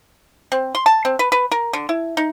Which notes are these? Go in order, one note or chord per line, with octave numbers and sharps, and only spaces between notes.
C4
C6
A5
C4
B4
B4
A#4
D3
E4
D#4